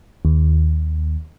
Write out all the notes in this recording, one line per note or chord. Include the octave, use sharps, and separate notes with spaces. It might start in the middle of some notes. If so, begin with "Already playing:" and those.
D#2